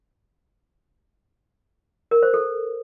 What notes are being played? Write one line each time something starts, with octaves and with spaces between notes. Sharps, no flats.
A#4
C5
A4